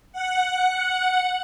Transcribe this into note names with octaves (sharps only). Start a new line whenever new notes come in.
F#5